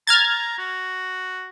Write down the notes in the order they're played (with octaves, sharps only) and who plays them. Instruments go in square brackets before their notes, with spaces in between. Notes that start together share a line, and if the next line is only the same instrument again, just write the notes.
[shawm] A#5 [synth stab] F6 G#6 A6
[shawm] F#4